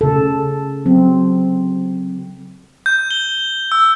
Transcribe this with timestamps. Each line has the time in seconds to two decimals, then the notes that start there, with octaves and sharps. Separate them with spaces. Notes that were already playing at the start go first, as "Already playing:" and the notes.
0.01 C#3 A4
0.86 F#3 C4
2.86 G6
3.11 G7
3.72 E6